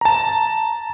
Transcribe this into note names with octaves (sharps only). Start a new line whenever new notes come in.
A5 A#5